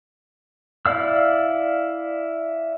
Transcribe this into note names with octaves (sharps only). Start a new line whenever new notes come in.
E4 D5 F5 E6